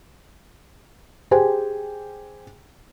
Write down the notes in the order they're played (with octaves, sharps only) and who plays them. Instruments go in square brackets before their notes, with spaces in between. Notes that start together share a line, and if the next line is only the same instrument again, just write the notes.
[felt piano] G4 G#4 C5 G5 G#5